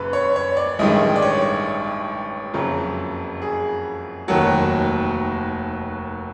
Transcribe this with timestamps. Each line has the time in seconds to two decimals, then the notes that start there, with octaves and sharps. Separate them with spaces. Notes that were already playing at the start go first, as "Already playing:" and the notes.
Already playing: F#1 F#2 C#3 B4
0.13 C#5
0.36 C#5
0.57 D5
0.79 A1 G2 D#3 G#3 D#5
1.16 D5
1.22 C#5
2.54 F#1 F2 C#3 F#3
3.42 G#4
4.28 F1 D#2 D#3 F#3 F#4